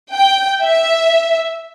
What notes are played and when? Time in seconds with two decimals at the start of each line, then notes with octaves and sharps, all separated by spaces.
0.12 G5
0.63 E5